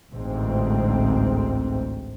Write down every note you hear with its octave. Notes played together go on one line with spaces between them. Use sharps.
A1 D2 G#2 C4